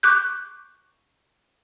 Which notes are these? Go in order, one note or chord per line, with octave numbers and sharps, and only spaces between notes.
C#6 D6 F#6 G6